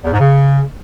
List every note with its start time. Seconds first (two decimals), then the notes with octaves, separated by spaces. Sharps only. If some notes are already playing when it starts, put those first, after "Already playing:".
0.04 E2
0.12 G#2
0.20 C#3